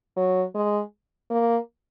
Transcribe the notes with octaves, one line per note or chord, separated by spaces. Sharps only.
F#3
G#3
A#3